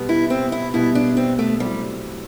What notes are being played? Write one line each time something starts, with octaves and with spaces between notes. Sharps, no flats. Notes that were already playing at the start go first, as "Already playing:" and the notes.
Already playing: B2 G3 B3
E4
C4
E4
B2 G3 B3 E4
D4
C4
A3
F#3 G3 C4 E4 G4